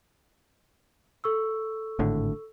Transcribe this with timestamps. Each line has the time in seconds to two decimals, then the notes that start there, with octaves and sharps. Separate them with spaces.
1.24 A4 C#6 E6
1.99 G#1 A2 D3